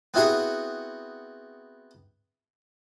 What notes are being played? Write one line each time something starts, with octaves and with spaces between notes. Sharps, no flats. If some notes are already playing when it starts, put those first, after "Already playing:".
B3 C4 E4 F#4 G#4